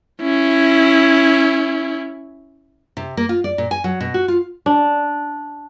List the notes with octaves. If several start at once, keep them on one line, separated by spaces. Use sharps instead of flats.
C#4 E4
C3
A#3
F4
D5
A#2
G#5
F#3
B2
F#4
F4
D4